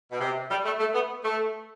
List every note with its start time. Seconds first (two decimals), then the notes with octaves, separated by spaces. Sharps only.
0.10 B2
0.20 C3
0.49 G3
0.64 A3
0.79 A3
0.93 B3
1.23 A3